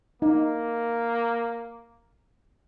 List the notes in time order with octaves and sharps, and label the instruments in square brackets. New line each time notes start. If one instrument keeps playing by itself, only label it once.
[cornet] A#3 [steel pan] D#4